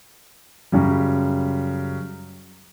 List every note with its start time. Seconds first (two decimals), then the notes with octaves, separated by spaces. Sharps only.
0.72 F#2 C#3 G3